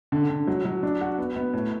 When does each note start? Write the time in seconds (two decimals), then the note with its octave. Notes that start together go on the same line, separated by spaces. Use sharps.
0.12 D3
0.30 D3
0.47 F#3
0.65 F#3
0.83 D4
1.01 F#4
1.18 B3
1.36 B3
1.53 A2